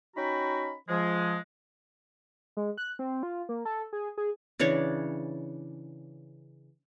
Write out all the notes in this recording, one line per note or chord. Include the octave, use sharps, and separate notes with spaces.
C#4 D#4 F#4 G5 A#5 B5
F3 G#3
G#3
F#6
C4
F4
A#3
A4
G#4
G#4
C#3 E3 D4 C#5